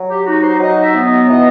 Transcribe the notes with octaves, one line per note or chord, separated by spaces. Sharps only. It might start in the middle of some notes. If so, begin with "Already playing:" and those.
Already playing: F#3
G4
D#4 F#4
C5
F#3 D#5
E5
B3
D#5
E3 D#5